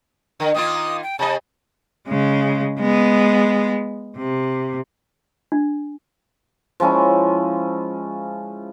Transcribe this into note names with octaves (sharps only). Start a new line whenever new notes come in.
D3 A#4
D#3 A#3 F4 D#6
G5
C3 D#5 A5
C#3 G#3
G#3 B3
C3
D4
F3 G#3 C#4 E4